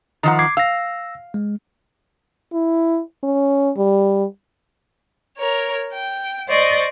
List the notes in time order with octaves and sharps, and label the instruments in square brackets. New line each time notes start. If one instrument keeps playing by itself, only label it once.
[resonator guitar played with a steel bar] D#3 F3 F#5 [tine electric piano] A#5
[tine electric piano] D6 G#6 C7
[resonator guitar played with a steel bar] F5 [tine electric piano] E6 A#6
[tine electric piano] G#3
[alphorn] E4
C#4
G3
[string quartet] A#4 C#5
G5
C5 D5 D#5 C#6